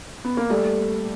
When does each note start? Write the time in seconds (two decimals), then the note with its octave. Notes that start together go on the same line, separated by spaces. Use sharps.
0.25 B3
0.37 A#3
0.50 G3 A3